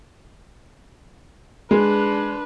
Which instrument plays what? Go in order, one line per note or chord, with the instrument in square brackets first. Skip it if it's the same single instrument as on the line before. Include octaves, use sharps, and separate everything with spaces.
[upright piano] G#3 [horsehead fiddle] D4 B4